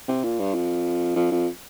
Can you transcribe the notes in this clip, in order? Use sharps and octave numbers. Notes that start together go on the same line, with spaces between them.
C3
A#2
G2
F2
F2
F2